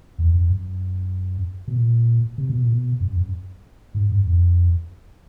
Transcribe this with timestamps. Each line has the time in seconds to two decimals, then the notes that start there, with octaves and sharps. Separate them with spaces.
0.18 E2
0.34 F2
0.50 F#2
1.68 B2
1.76 A#2
2.38 C3
2.50 B2
2.61 A#2
2.72 B2
3.01 F#2
3.17 F#2
3.95 G#2
4.11 G2
4.26 F2